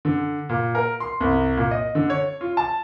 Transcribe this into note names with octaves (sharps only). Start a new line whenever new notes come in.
D3
A#2
A#4
C6
C2
A#2
D#5
D3
C#5
F4
A5